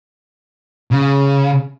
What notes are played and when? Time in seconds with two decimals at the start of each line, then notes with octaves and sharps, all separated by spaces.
0.91 C#3